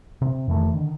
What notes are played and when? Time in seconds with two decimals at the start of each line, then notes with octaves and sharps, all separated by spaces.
0.21 C3
0.47 F2 D#3 E3 A3
0.73 D3 D#3